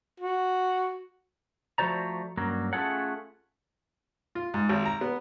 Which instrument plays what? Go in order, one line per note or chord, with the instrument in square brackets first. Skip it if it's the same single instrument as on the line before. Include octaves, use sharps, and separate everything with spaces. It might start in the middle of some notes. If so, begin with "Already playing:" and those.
[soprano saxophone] F#4
[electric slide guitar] F3 A3 F#4 C5 D5 A#5
G2 F#3 A#3 C#4 A#4
A3 C#4 F4 G#4 A4 F#5
[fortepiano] F4
G#2
G#1
A#5
B3